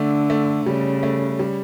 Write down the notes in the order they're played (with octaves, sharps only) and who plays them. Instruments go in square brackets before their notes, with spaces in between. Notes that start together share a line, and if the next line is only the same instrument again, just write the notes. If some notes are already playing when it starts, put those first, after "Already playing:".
Already playing: [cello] D3 [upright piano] A3
[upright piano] A3
[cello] C#3 [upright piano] G3
[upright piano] A3
G3